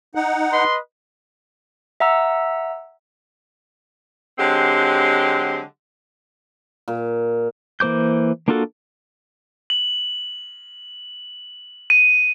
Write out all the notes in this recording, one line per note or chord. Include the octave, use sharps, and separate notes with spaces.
D#4 F#5
B4 D#5 C6
E5 F#5 A#5 E6
D3 F#3 G#3 C4 G4
A#2
E3 A#3 C5 D6 G6
A#3 D4 F4 F#4 A4
F#7
D#7